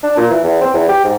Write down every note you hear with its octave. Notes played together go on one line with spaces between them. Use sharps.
D4
A#2
E3
E2
C4
E2
G4
G#2